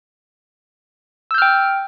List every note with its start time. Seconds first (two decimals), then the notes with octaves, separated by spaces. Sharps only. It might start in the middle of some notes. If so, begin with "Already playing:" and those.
1.31 E6
1.34 G6
1.38 F6
1.42 G5